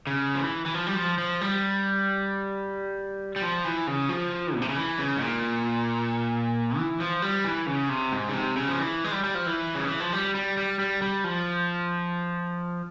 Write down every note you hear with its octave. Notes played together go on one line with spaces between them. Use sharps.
C#3
F3
E3
E3
F3
G3
F3
F3
G3
G3
F3
E3
C#3
F3
A#2
C3
C#3
E3
C#3
G#2
A#2
E3
F3
G3
E3
C#3
C3
G#2
C#3
C3
C#3
F3
E3
G#3
G3
G3
F3
E3
C#3
E3
F3
G3
G3
G3
G3
G3
F3